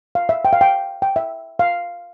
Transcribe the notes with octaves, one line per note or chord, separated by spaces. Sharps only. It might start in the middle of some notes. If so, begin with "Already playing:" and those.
F5
E5
G5
F5
G5
G5
E5
F5